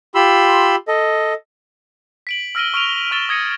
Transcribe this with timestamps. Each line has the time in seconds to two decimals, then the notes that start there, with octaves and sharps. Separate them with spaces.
0.15 F4 G4 B5 C6 E6
0.88 A4 D#5
2.27 B6 D7 F#7
2.55 E6 F6 A#6 D7 D#7 G7
2.74 C#6 F6 D7 D#7 F7 G7
3.11 C#6 E6 F6 A6 E7 G7
3.29 D#6 G#6 A#6 C#7 D#7